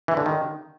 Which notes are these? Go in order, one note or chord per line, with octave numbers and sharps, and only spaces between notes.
E3
D3
D#3